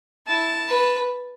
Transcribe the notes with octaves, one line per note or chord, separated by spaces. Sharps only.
E4 A5
B4